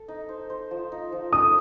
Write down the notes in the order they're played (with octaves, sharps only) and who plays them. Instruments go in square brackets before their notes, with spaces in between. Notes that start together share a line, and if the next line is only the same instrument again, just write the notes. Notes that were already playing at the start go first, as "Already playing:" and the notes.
Already playing: [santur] A4
D#4
C5
C5
F3
D#4
F3
[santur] A4 [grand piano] D#6